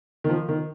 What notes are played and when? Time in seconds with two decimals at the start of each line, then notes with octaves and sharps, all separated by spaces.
0.24 D#3
0.29 F3
0.49 D#3